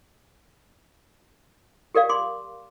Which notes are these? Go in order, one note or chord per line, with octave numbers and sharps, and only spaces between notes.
G4 A#4 D5 F5
C6 D6